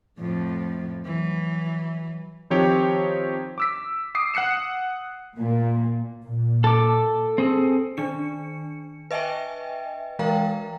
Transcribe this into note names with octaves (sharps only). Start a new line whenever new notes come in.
F2 A2
E3 F#3
D#3 F3 C4 D#4 G4 C#5
D6 E6 B6
D6 D#6 C7
F#5 F#6 C7 C#7 E7
A#2
A#2
A4 D6
C4 G#4 A4
D#3 D4 C#7
B4 D#5 E5 G5 G#5
E3 G#3 A#4 F5 G5 A#5